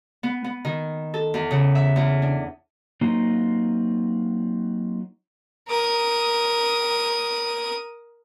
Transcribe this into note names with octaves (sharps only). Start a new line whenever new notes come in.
B3
B3
D#3
A4
E2
C#3
E5
E2
D4
F#3 A#3 C4 D#4 F4
A#4 D#6